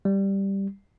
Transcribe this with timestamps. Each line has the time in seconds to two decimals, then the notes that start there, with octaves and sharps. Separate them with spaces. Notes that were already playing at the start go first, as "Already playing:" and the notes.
0.05 G3